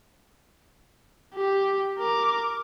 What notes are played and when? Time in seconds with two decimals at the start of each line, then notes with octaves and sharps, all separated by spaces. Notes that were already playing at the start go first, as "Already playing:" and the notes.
1.35 G4
1.99 A#4 D6